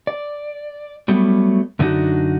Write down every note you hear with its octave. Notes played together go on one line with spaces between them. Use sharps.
D5
F#3 G3 A3 B3
F#2 D3 B3 D4 D#4 F#4